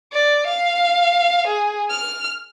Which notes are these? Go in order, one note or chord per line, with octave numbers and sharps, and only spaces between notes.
D5
F5
G#4
F6